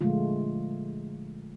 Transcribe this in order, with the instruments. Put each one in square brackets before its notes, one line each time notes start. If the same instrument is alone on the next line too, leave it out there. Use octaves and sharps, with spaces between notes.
[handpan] A#2 D3 F3 G#3 A3 F4